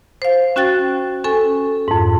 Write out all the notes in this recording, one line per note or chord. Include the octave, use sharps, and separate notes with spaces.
C5 F5
C#4 F#4 G5 F#6 A6
C#4 A4 G#5
F2 G#2